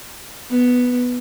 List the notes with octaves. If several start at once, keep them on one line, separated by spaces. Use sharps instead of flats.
B3